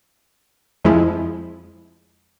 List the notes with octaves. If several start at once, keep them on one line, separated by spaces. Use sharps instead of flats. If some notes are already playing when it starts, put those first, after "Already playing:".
F2 F3 G#3 E4